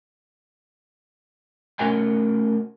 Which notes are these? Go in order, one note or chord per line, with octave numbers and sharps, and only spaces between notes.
A3 C#4 F#4 A#4 D#5 G#5